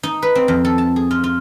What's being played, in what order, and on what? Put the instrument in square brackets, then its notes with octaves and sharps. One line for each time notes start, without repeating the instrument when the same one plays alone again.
[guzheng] D#4
B4
C4
F2
A4
A5
G#4
F4
F4